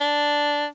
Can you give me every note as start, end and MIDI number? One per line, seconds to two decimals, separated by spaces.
0.01 0.65 62